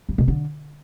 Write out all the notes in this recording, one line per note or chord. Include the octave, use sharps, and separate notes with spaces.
G2
B2
D3